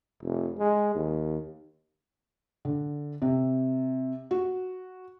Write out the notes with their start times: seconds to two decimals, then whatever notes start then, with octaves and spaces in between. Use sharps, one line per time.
0.23 F1
0.59 G#3
0.95 D#2
2.65 D3
3.22 C3
4.31 F#4